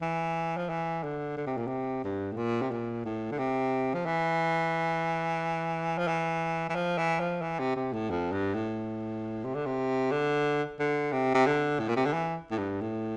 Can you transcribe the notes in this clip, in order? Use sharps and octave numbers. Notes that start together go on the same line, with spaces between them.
E3
F3
E3
D3
D3
C3
A#2
C3
G2
A2
A#2
C3
A#2
A2
D3
C3
F3
E3
F3
E3
E3
F3
E3
F3
E3
C3
C3
A2
F2
G2
A2
C3
D3
C3
D3
D3
C3
C3
D3
A2
A#2
C3
D3
E3
A2
G2
A2